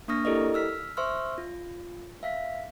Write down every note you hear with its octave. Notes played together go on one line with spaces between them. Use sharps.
A#3 D4 C#6 D#6 F6 A#6
E4 G4 A4 A#4 D5 D#5
E6 F6 B6
C5 E5 C6 C#6 E6 F6
F4
E5 F5 B6